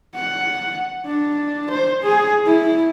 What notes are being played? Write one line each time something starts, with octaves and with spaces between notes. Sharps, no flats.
F#5
D4
C5
G#4
E4